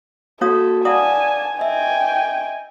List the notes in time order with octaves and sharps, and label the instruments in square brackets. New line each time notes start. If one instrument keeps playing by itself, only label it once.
[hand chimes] A#3 F#4 [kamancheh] A4 [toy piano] C#5 F5 D#6
[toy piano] E4 F#5 D#6 [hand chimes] D5 F5 D6 [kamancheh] G#5 A5
[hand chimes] D#5 E5 [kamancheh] G5 G#5